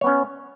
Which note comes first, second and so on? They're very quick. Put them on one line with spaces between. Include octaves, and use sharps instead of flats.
C#5 B3 C#4